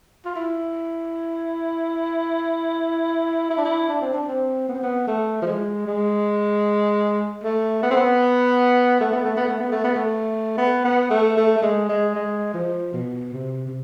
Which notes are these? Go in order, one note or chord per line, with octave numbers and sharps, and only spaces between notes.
F4
E4
E4
D4
E4
D4
C4
D4
C4
B3
C4
B3
A3
F3
G#3
G#3
A3
B3
C4
B3
A3
B3
A3
B3
A3
B3
A3
B3
A3
B3
B3
A3
A3
A3
G#3
G#3
G#3
F3
B2
C3
C3